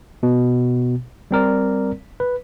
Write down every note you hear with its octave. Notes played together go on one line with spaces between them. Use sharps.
B2
G3 C4 A#4 D5
B4